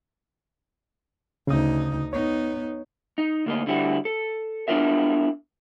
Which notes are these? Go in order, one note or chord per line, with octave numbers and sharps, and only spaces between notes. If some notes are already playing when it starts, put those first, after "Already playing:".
D2 C#3 D#4 D#6
B3 D#4 C#5
D#4
D2 A#3 D#5
D3 G3 E4 F#4
A4
B3 D4 E4 F4 A#4 E5